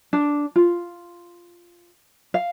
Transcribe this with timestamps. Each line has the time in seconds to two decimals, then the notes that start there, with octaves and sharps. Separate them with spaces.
0.13 D4
0.56 F4
2.34 F5